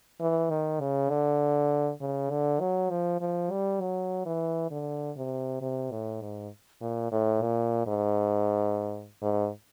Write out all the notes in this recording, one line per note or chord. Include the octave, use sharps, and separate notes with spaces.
E3
D#3
C#3
D3
C#3
D3
F#3
F3
F3
G3
F#3
E3
D3
C3
C3
A2
G#2
A#2
A2
A#2
G#2
G#2